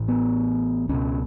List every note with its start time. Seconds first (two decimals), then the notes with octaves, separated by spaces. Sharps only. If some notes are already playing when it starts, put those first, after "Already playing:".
Already playing: A1 A2
0.08 B3
0.89 C#2 B2 C#4